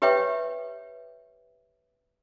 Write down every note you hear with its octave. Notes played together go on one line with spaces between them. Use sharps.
G4 B4 C#5 E5 G5